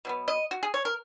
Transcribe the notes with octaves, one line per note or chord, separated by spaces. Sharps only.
B2 F#3 B3
D#5
F#4
G#4
C#5
A#4